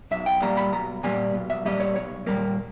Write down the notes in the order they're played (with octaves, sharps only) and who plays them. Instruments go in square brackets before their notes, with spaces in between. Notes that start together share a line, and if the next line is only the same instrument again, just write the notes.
[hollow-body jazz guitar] B1 E5
G5
A#2 G3 A#3 A#5
B5
B1 A#5
A#2 G3 A#3 G#5
B1
E5
A#2 G3 A#3 D#5
C#5
B1 C#5
A#2 G3 A#3 A#4